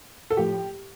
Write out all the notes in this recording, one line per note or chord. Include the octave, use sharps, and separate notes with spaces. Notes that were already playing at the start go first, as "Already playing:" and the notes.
A4
A2 F3 G4